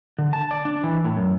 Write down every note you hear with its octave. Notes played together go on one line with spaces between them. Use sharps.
D3
A5
D5
D4
E3
A2
F#2